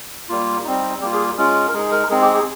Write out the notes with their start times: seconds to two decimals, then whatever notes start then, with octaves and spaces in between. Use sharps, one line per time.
0.29 G3 A#3 F4
0.64 G3 C4 D#4
1.01 G3 A#3 F4 G4
1.13 G#4
1.38 G#3 C#4 F4
1.68 A#4
1.74 G#3 D#4 G#4
1.91 A#4
2.10 G#3 C4 D#4 G#4
2.22 G4
2.34 G#4